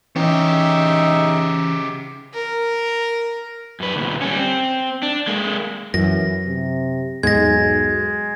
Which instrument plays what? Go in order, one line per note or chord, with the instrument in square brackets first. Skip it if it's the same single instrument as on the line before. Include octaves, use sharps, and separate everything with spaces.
[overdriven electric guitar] C#3 G4 [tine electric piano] E3 C#4 [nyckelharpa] D#4 E5
[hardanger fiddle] A#4
[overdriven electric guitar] F#2 B4
D2 A#2
G3 C#4
C4
D4
G#3 A#3
[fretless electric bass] F#2 [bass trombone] E3 [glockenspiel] A#6
[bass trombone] C3
[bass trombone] B1 [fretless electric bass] E2 G#2 B3 [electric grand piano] G#3 [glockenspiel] G#6 A#6